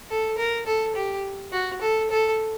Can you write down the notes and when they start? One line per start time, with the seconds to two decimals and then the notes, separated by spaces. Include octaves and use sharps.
0.10 A4
0.38 A#4
0.66 A4
0.95 G4
1.52 F#4
1.81 A4
2.10 A4